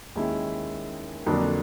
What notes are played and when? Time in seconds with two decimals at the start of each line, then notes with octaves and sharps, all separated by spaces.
0.16 D#2 D#3 G#3 C#4 E4
1.26 F2 D3 F#3 A#3 D4